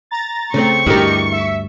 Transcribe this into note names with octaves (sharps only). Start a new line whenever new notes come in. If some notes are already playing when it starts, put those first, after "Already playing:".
A#5 A6
C#3 A3 C4 C#6
D2 G2 E4 G4 G#4 A#4 D#5 C#7
E5